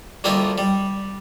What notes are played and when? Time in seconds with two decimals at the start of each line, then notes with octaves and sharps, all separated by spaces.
0.24 D2 G3 A#3 F4 D#5 E5
0.58 G3